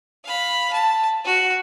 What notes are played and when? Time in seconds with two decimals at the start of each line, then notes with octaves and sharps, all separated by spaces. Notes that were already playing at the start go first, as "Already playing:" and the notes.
0.25 F5 B5
0.73 A5
1.25 F#4